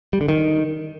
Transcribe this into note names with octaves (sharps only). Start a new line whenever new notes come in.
G3
D3
D#3